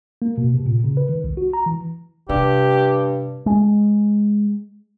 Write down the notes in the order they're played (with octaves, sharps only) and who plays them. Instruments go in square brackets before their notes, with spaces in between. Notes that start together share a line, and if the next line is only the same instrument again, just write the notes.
[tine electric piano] A#3
B2
C3
A#2
C#3
B4
D#3
C2
F#4
A#5
E3
[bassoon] G2 [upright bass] C3 [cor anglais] G4
[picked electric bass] G#3